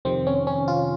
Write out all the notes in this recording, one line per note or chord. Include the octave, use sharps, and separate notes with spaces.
F2 C3 D#3 C4
C#4
C#4
F4